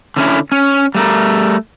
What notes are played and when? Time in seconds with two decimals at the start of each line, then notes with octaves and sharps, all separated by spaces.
0.17 D3 C#4 E4
0.52 C#4
0.95 G3 A3 A#4